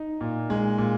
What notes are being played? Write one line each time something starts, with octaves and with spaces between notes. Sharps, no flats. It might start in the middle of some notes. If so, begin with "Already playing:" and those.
Already playing: D#4
A#2
G#3
A#2